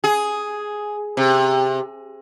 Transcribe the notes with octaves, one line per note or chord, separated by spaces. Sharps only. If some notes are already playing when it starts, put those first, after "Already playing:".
G#4
C3